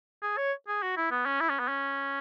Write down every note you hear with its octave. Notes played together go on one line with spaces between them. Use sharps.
G#4
C#5
G#4
F#4
E4
B3
C#4
E4
C#4
B3
C#4